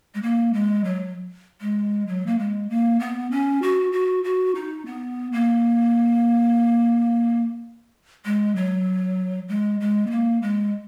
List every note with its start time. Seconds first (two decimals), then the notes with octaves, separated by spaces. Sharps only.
0.14 G#3
0.23 A#3
0.54 G#3
0.84 F#3
1.61 G#3
2.07 F#3
2.27 A#3
2.39 G#3
2.70 A#3
3.00 B3
3.31 C#4
3.62 F#4
3.92 F#4
4.24 F#4
4.55 D#4
4.86 B3
5.32 A#3
8.25 G#3
8.56 F#3
9.49 G#3
9.80 G#3
10.07 B3
10.10 A#3
10.42 G#3